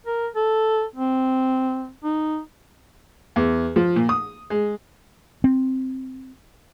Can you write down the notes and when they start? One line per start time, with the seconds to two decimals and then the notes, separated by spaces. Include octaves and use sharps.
0.06 A#4
0.35 A4
0.96 C4
2.04 D#4
3.36 E2
3.76 F3
3.96 A#2
4.09 D#6
4.50 G#3
5.44 C4